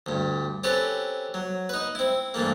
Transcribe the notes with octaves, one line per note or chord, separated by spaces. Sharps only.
D2 G2
C4 C#4 G4 A4 B4
F#3
D#4 B4
C4 E4
G2 E3 A3 A#3